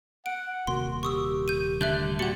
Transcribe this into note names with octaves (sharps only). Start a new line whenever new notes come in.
F#5 D7
D#1 C3 A#3 F#4 C6
G4 C#6 D#6 E6
G6 D#7
D3 G3 A3 E5 F#6 G6
A#2 G3 F#4 F#5 C#7